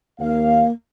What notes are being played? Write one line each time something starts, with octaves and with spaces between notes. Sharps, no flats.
D#2 A#3 F5